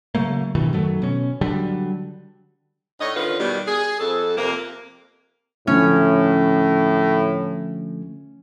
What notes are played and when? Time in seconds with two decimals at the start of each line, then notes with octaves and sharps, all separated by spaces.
0.15 C#3 F#3 A3 A#3
0.55 G2 B2 D#3 E3
0.73 F#2 D#3 F#3 A3
1.02 B2 C#4
1.41 D3 F#3 G3 D4
3.00 A2 D3 C#5 D#5
3.16 D3 D#3 C#4 F4 B4
3.39 B2 D#3 G3
3.67 G#4
3.99 F2 A4
4.37 F2 C3 A#3
5.67 A2 D3 F3 A3 C#4